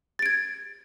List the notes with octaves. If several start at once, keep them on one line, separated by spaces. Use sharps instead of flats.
G#6 A6 D7